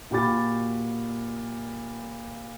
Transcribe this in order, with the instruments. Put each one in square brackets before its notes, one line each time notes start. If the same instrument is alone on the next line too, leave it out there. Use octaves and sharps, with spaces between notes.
[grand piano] A#2 F#4 G4 B5 D6 A6